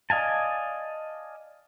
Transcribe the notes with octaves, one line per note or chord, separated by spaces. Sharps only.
D5 D#5 F5 G#5 A5